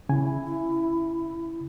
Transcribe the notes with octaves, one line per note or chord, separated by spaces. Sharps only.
C#3 E4 G#5